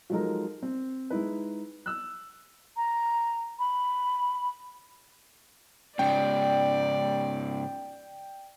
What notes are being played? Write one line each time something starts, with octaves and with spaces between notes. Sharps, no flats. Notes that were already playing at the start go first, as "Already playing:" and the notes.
F3 F#3 G#3 D#4 A4 A#4
C4
G#3 D#4 E4 B4
E6 F#6
A#5
B5
G#2 C#3 D5 G5